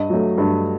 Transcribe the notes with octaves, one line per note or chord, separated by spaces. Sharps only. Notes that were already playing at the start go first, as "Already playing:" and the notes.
Already playing: G2 D#5
F#3 A3
G2